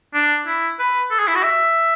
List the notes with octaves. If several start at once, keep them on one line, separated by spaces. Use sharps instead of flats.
D4
E4
B4
A4
G#4
E4
F#4
E5